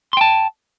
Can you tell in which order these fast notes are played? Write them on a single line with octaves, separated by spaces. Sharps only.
C6 G5 A5